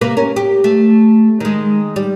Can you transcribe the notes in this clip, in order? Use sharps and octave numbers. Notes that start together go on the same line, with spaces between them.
C3 A#3 B4
C#4 A#4
G4
A3
D#3 G#3
G3